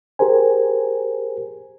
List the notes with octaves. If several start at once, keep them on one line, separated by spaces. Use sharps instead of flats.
G4 G#4 A#4 C5 G#5